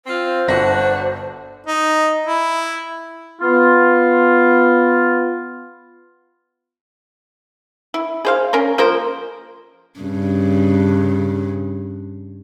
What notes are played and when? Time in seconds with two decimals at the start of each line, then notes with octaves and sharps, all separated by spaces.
0.06 C4 F4 C5
0.48 G1 D4 F#4 A#6
1.67 D#4
2.26 E4
3.41 B3 F4
7.94 E4
8.25 G#4 C5 F5
8.53 C#4 A#4 C6
8.78 F3 A#3 A#4 C5
10.00 G2 C#3